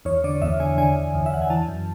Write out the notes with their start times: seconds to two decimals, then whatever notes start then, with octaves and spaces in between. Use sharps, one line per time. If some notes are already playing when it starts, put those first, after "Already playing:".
0.05 E2 C#5
0.24 D3 D5
0.42 E2 E5
0.60 D3 G#5
0.78 D3 G#5
0.96 E2
1.15 E2
1.26 E5
1.32 E2 F#5
1.42 G#5
1.50 E3 A5
1.69 F#2